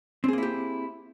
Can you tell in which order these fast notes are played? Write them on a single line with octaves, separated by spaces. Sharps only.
C4 G#4 A#3 E4 G4